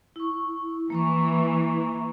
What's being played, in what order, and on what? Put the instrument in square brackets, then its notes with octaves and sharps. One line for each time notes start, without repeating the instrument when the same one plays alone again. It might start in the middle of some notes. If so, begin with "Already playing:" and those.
[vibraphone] E4 C#6
[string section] E3 [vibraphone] A#3 A#5 C#6